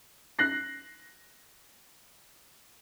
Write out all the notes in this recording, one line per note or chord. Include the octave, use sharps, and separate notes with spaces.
F#6 A#6 C7